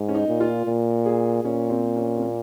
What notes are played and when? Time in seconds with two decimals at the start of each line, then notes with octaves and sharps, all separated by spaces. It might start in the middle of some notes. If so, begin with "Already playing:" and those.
Already playing: G#2
0.09 C#4
0.15 D#4
0.28 A#2
0.40 F4
0.66 A#2
1.06 G#4
1.43 A#2 C#4
1.70 C4
1.96 C#4
2.17 C4
2.22 A#3